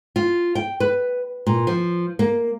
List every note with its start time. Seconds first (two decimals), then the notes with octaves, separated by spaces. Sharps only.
0.16 F4
0.55 G5
0.80 B4
1.47 A#2
1.67 F3
2.19 A#3